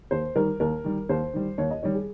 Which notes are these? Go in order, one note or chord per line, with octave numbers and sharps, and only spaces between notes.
D#2 C5
D#3 G3 A#4
D#2 A#4
D#3 G3
D#2 C5
D#3 G3
D#2 C#5
D#5
D#3 G3 C#5
G#4